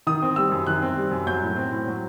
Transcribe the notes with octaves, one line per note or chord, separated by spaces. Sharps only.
D#3 D#6
C4
G3 E6
F#2
D#3 F#6
C4
G3
F#2
F#3 G6
A2
C4
A2
F#3